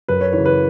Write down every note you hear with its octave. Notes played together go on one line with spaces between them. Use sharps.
F#2 B4
C#5
C#3 E3 C#5
B4